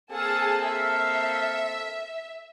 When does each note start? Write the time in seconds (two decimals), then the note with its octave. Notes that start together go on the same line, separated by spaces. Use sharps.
0.11 A#3 C4 G#4 A4 F5 A5
0.67 E5